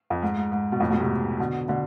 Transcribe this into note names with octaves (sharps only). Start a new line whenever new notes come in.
F2
G#2
G#2
G#2
B2
F2 A2
G#2 B2
A2 C3
B2 D3
B2 D3